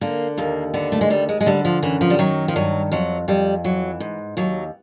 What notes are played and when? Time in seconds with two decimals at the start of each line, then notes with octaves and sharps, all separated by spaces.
0.01 D3 A#3
0.38 D#2 A#3
0.74 D3 B3
0.92 A3
1.01 G#3
1.10 D#2 G3
1.29 G#3
1.41 G#3
1.46 D3 G3
1.65 F3
1.83 F#2 E3
2.01 F3
2.10 G3
2.19 D#3 F#3
2.48 F3
2.56 G2 F#3
2.92 F2 F#3
3.28 F2 G3
3.64 E3 F#3
4.00 G#2
4.37 D#2 F#3